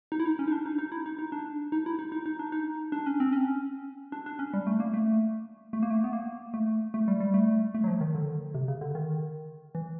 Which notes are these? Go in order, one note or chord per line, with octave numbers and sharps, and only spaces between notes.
D#4
E4
D#4
C#4
D#4
D4
D#4
D#4
E4
D#4
D#4
D4
D#4
E4
D#4
D#4
D#4
D4
D#4
D4
C#4
C4
C#4
D4
D4
C#4
G3
A3
A#3
A3
A3
A#3
A3
B3
A#3
A3
A3
G3
G3
A3
A3
F#3
F3
D#3
D3
C3
C#3
D3
D#3
E3